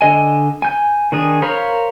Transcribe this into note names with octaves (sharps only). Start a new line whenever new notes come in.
D3 D#5 G#5
G#5 G6
D#3 D4 G#4
A#4 C5 C#5 F5 B5